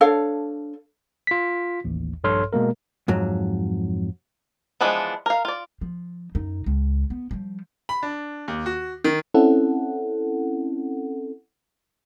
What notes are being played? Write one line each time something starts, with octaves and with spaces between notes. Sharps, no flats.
D4 A4 C#5 F5
F4 B6
A1 D#2
A#1 G2 A4 C#5 C6 F6
B2 G#3 A#3 A#4
F2 G#2 F#3
E3 F3 G#3 B3 D4
A#4 F5
F4 D5
F3
F#2 D#4
C#2
B3
F3 G3
B5
D4
D#2
F#4
D#3
C4 C#4 E4 A4 F#5